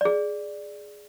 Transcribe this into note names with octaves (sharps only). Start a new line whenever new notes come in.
G#4 D5